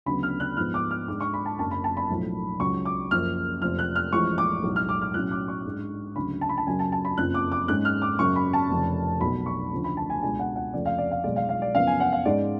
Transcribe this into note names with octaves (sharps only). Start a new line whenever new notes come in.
D2 C#3 F#3 B3 B5
F6
F#6
G#2 F3 B3 F6
D6
F6
G#2 G#3 D4 D6
C#6
B5
A5
F#1 F#2 D3 A5
B5
A5
B5
B1 A2 F3 A3
C#2 C#3 F#3 C#4 C#6
D6
F#1 F#2 F3 F6
F1 F2 F3 F6
F#6
F6
A1 A2 F3 G#3 C#6
D6
B1 A2 G#3
F6
D6
F6
B1 A2 F#3 C#4 F#6
D6
C#6
G#2 G#3 D4
D2 C#3 F#3 B5
A5
B5
A5
F#2 C#3 F#3 C#4 G#5
A5
A5
B5
F#1 F2 C#3 F3 F#6
D6
D6
G#2 G#3 C#4 F#6
F6
D6
F#2 C#3 F#3 C#4 C#6
B5
A5
F1 F2 C#3
B1 B2 F#3 B5
C#6
D2 C#3 F3 A3
B5
A5
G#5
C#2 B2 G#3 D4 G#5
F#5
F#5
F1 F2 C#3 F3 A3 D5
F5
D5
F5
B1 B2 G#3 D5
F5
F5
D5
F#2 C#3 F3 B3 F5
G#5
F#5
F5
G#2 G#3 C#4 D5